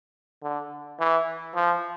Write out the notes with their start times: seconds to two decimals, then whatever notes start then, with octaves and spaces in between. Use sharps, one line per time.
0.43 D3
1.00 E3
1.55 F3